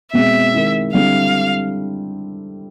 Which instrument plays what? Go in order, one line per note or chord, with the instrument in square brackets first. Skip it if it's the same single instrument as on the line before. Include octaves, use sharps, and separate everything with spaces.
[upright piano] B2 G#3 C4 [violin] E5
[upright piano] D#3 G#3 C4 E4
[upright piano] D3 G3 C4 E4 [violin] F5